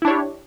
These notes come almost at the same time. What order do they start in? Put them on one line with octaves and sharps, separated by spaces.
E4 D4 C#5 G4